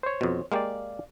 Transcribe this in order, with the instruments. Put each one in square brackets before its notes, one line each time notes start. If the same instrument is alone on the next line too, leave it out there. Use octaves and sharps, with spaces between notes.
[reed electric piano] C5 C#5
[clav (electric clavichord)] F2 B2
[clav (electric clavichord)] G#3 A#3 G4 [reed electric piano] D5 F5